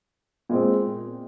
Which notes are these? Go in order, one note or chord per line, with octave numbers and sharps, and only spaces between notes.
A#2 G#3 C4